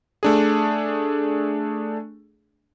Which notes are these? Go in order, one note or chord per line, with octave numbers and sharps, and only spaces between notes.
A3 D4 G#4